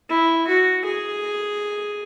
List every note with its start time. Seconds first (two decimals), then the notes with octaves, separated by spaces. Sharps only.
0.09 E4
0.47 F#4
0.85 G#4